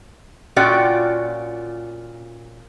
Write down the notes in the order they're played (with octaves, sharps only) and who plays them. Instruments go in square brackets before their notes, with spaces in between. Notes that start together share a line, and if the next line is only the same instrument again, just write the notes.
[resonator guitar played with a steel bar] A#2 C#4 F4 F#4 D5 G5